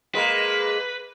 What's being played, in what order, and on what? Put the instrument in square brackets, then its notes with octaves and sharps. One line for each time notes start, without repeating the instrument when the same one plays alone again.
[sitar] G#3 A#3 [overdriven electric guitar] B4